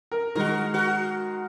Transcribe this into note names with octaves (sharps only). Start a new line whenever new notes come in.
A#4
D#3 G#3 F#4 A#4
F#4 A#4